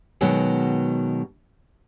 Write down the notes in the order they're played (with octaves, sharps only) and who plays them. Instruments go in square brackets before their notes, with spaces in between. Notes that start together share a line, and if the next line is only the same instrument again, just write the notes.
[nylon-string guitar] B2 D#3 F#3 G#3